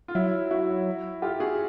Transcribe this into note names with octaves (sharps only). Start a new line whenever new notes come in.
F4
F#3 E4
E4 F#4
F4 G4
F#4 G#4